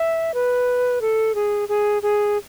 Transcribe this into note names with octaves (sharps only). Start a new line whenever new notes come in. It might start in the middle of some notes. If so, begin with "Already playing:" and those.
Already playing: E5
B4
A4
G#4
G#4
G#4